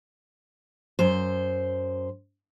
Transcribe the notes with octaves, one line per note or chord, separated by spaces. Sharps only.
F#2 C5